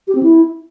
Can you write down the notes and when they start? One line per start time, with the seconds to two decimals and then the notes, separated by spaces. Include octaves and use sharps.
0.08 G4
0.15 C4
0.23 E4